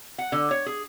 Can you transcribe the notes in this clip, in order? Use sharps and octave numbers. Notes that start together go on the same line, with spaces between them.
F#5
D3
C#5
G#4